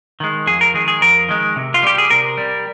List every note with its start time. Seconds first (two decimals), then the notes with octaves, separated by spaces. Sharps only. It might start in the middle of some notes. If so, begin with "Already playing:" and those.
0.20 D#3 G#3
0.47 F2 G#4
0.61 A#4
0.74 D#3 G#3 G#4
0.88 G#4
1.01 F2 A#4
1.29 D#3 G#3
1.56 C3
1.74 F4
1.83 G3 G4
1.98 G#4
2.10 C3 A#4
2.38 G3